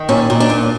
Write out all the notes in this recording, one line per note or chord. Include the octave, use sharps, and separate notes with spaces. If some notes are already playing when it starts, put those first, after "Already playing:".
Already playing: D#3
A#2 C#4
A#2
D4
A#2